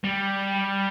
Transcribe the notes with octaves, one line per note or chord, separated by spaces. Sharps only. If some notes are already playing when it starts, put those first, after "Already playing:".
G3